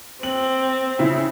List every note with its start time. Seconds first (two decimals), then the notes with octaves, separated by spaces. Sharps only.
0.23 C4 F#7
0.99 C#3 E4